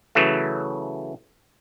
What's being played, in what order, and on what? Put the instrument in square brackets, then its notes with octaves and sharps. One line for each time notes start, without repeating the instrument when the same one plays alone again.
[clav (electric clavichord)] C#3 E3 F#3 A3